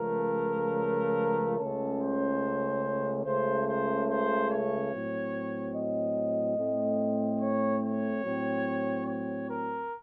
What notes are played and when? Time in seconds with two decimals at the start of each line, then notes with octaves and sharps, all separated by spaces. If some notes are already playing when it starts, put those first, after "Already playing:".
Already playing: C#2 C#3 F3 A3 A#4
1.58 C#2 C#3 A3 C#4 A4
2.00 C5
3.25 C#2 C#3 A3 C5
3.66 C5
4.08 C5
4.50 C#5
4.92 A2 F#3 C4
5.74 D#5
6.57 A2 A3 C4
7.40 C#5
7.83 C#5
8.24 A2 F#3 C4
9.06 C#5
9.49 A#4